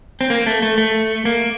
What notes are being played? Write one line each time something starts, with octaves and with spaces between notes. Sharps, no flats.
C4
A#3
A3
A3
A3
A#3